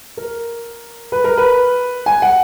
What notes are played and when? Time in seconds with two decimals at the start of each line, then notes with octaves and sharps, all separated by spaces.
0.17 A#4
1.12 B4
1.24 A#4
1.38 B4
2.06 G#5
2.22 F#5